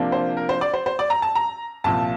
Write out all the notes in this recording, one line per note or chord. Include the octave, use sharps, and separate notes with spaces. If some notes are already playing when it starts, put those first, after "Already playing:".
Already playing: C3 F3 A#3 D4
C5
A#4
C5
D5
C5
C5
D5
A#5
A5
A#5
C2 A#2 F3 A5